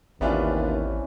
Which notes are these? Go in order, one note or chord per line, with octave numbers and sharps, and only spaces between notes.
A1 D#2 C3 E3 B3 C#4 D4 F4